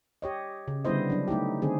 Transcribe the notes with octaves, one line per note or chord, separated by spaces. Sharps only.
G4 C#5 D#5
C#3
D3 G3 B3 E4 C5 D#5
F#3 D4
A3 D#4 E4 G4
D3 D#3 C4 G#4